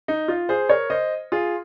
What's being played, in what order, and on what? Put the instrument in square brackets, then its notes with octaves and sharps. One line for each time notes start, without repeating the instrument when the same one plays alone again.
[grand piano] D#4
F4
G#4 C5
A#4 C#5
C5 D#5
F4 G#4